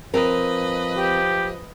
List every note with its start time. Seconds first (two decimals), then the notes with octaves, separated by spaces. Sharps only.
0.14 F3 C4 A#4 B4 D#5
0.98 G4